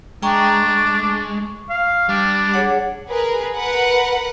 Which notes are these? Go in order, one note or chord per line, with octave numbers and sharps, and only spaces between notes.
G#3 D4 G5 A#5 C#6
C#6
F5
G3 D4
G#4 C#5 F#5
G#4 A#4 B4
A#4 B4 F#5